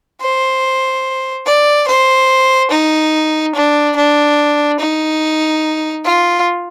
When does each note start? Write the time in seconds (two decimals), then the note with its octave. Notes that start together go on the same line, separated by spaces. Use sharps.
0.21 C5
1.46 D5
1.87 C5
2.71 D#4
3.55 D4
3.96 D4
4.80 D#4
6.05 F4